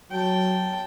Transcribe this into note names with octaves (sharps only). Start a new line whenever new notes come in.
F#3 G5 A5